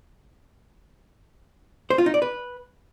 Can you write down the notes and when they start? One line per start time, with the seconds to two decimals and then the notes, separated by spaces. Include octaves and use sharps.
1.90 C5
1.98 F4
2.06 D#4
2.14 D5
2.22 B4